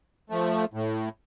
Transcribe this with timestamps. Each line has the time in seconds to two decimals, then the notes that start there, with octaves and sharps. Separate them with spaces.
0.30 F3 A3
0.73 A2